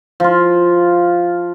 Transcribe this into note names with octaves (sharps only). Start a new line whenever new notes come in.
F3 F4